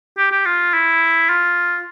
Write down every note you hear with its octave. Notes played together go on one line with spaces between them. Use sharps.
G4
G4
F4
E4
F4